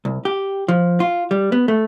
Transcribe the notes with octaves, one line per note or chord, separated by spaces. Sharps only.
C2
G4
F3
F4
G3
B3
A3